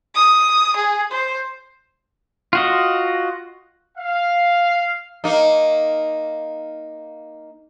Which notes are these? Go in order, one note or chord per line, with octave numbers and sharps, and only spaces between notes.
D#6
G#4
C5
F4 F#4 D#5
F5
A#3 D#4